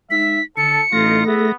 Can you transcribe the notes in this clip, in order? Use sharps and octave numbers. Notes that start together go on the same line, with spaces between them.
G#3 D#4 E5 B6
D3 A4 A5 C#7
A1 A3 D#4 F4 A#6
B3 E4 G#4 E5